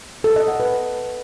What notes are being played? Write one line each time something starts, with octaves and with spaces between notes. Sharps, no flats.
A4
D#5
F#5
B4